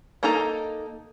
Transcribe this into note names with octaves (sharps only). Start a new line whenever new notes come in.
A#3 D#4 A4 A#5